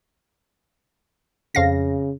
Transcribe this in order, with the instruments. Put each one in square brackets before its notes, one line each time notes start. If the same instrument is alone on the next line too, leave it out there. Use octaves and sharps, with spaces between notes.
[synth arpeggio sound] F2 F5 A#6 [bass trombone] C#3